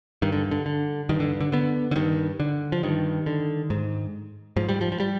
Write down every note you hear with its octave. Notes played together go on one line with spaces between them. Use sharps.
G2 D#3
D3
D3
D3
G2 D#3
D3
D3
D3 B3
D3
G2 D#3
D3
F3
G2 D#3
D3
G#2
G#2 F3
G3
F3
F3
G3